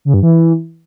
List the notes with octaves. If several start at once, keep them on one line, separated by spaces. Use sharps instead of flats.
C#3
G2
E3